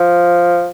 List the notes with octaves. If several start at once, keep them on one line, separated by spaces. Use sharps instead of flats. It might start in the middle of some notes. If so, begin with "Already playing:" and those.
Already playing: F3